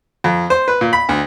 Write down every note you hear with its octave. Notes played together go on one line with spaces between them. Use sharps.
F2
C5
B4
A#2
B5
D2